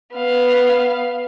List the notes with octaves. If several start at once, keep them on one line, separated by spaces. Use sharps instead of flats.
B3 F5